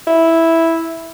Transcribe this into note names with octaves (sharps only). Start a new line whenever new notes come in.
E4